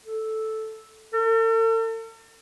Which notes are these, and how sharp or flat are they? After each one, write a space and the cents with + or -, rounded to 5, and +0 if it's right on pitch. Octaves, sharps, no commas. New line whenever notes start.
A4 -5
A4 +45